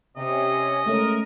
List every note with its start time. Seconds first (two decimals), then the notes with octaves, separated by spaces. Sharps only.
0.17 C3 C#4 D#5
0.86 G#3 A3 C#4 A#4